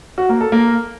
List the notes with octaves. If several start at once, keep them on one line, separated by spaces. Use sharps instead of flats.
F#4
A#3
A4
A#3